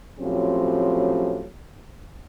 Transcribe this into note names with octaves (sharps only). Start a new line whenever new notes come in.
A2 F3 F#3 C4 C#4 G4